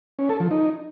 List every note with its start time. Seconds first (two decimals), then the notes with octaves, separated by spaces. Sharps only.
0.19 C#4
0.29 A4
0.40 F3
0.51 D#4